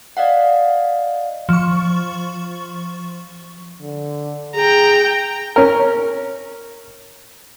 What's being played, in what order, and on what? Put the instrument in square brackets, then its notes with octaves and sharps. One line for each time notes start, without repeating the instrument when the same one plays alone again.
[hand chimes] D5 D#5 F5 F#5
[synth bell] F3 C#6
[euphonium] D3
[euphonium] G#4 [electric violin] G5 A#5
[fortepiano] C#4 A#4